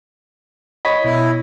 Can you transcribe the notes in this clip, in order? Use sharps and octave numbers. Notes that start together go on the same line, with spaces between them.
C#5 D#5 B5 B6
B2 E4